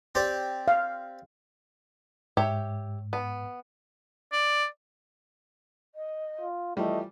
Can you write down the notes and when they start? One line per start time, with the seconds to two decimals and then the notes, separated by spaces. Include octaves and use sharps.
0.15 C4 G4 D5
0.68 F5
2.37 G#2 G4 C#5 E5
3.13 B3
4.32 D5
5.94 D#5
6.41 F4
6.77 E3 F3 G3 A3 D#5